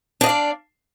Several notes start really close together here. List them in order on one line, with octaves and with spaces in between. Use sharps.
D4 D#5 F5 D5